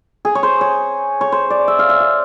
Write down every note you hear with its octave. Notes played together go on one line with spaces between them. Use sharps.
G#4
C#5
C5
C#5
C#5
C5
D5
E5
F5
E5
F5